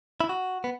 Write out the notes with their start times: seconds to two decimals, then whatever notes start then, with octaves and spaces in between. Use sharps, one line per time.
0.20 E4
0.29 F#4
0.64 B3